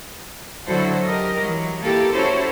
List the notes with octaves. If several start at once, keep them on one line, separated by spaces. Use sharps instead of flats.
D3 F#3 E4 F#4 A4 C5
G4 A#4 D#5
E3 F#3
A#3 E4 G4 A4
C#4 E4 F#4 A4 C5 C#5